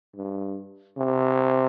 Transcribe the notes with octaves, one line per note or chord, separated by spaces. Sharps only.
G2
C3